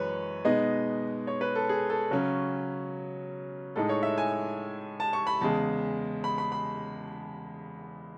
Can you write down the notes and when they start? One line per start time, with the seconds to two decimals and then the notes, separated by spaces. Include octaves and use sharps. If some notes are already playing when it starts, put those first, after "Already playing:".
Already playing: F#2 E3 G#3 B4 C#5
0.45 B2 G#3 B3 D#4 D#5
1.27 C#5
1.41 B4
1.55 A4
1.69 G#4
1.90 A4
2.11 C#3 F#3 C#4
3.76 A2 G#3 D#4 A4
3.89 C#5
4.03 E5
4.18 G#5
5.00 A5
5.13 C#6
5.27 B5
5.41 E2 C#3 G#3 A5
6.24 B5
6.38 B5
6.52 B5